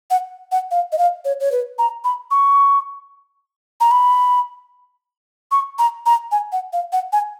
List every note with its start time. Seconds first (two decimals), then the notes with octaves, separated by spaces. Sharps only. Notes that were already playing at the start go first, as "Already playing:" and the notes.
0.10 F#5
0.52 F#5
0.71 F5
0.92 D#5
0.98 F5
1.25 C#5
1.40 C#5
1.52 B4
1.79 A#5
2.04 B5
2.31 C#6
3.81 A#5
3.91 B5
5.51 C#6
5.79 A#5
6.06 A#5
6.32 G#5
6.52 F#5
6.73 F5
6.93 F#5
7.13 G#5